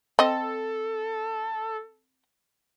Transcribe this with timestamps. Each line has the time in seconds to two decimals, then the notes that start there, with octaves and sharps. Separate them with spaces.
0.19 C4 A4 D#5